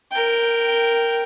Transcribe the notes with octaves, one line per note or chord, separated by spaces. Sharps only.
A#4 G5